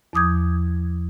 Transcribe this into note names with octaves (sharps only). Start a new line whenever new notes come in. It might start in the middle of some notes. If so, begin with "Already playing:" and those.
E2 F3 D6 D#6 G6 G#6